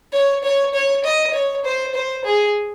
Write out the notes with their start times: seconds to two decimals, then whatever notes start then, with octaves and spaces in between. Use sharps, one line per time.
0.12 C#5
0.43 C#5
0.74 C#5
1.04 D#5
1.33 C#5
1.64 C5
1.94 C5
2.24 G#4